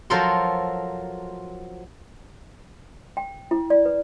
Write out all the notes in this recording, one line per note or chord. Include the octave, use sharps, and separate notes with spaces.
F3 F#3 A4 A#4 C5 C6
G5
E4
D5
B4